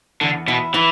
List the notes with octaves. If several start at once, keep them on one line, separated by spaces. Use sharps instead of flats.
E2 D3
B2 E4
E3 E4